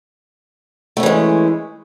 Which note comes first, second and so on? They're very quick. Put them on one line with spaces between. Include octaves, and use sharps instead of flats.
A3 C#4 E3 G#3